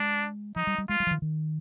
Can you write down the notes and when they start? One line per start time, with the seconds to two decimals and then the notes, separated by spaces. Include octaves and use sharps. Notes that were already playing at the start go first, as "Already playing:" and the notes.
Already playing: G#3 D4
0.56 F3 D#4
0.67 G3
0.78 G3
0.89 G#3 F4
1.00 G3
1.07 F3
1.11 D#3
1.22 D#3